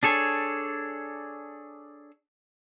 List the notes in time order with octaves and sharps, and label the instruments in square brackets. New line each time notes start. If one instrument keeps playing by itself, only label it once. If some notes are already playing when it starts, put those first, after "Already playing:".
[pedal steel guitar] D4 G#4 A4 C#5